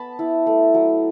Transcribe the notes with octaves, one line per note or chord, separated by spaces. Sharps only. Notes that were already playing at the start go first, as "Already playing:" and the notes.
Already playing: B3 A5 B5
E4
A3
F#3